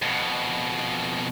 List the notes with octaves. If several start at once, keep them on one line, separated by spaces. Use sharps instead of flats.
F2 B2